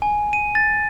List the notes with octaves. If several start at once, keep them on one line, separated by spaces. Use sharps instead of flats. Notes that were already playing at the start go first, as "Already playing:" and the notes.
G#5
D#7
A6